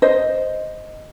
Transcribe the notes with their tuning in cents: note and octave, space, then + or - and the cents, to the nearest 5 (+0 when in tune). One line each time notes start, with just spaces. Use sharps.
C5 +0 D#5 +0